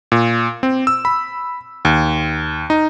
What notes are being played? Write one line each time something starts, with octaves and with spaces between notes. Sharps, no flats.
A#2
C4
E6
B5
D#2
D#4